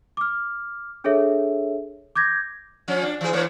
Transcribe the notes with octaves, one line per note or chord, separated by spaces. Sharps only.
D6 F6
D4 G#4 A4 C#5 E5
D6 G6 G#6 A#6
F3 C#4
D4
E3 G#4
E3 A#3 C#5